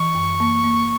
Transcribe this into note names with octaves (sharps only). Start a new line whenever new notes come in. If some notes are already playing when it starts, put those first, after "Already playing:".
Already playing: E3 C#6
F#2
A#3
A#3